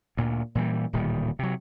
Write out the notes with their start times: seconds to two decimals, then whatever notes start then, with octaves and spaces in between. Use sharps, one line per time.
0.17 D2 A#2
0.55 A#2 E3 G3
0.93 D1 A#2 D#3 G3
1.39 C3 F#3